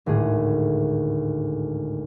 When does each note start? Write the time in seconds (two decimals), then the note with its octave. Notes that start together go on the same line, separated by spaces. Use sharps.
0.06 G#1 D2 A2 G#4